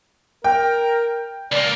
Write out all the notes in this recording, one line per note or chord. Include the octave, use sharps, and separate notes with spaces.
A#4 G5
C#2 A#3 D5